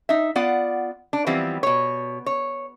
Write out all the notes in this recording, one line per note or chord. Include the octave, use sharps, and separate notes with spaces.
D#4 E5
B3 F4 D5 F#5
D4
E3 F3 G3 B3 C4
B2 C#5
C#5